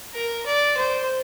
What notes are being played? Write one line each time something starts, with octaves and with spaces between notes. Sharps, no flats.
A#4
D5
C5